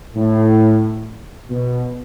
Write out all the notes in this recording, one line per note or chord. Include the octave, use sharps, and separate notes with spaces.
A2
B2